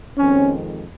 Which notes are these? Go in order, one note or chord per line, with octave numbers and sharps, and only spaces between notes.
F2 D#3 G#3 C4 C#4